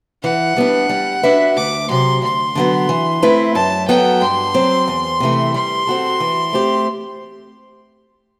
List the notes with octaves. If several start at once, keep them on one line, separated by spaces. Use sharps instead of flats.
E3 F#5
G3 B3 D4
G3
D4 F#4 B4 E5
D2 D6
C3 F#3 C6
D2 C6
D3 F#3 B3
E3
A3 C4 E4 B4
F#2 A5
F#3 B3 F#4 A4 G5
G2 C6
F#3 C4
E2
C3 E3 A3
G3 C6
C4 F#4 A4
E3
A3 C4 G4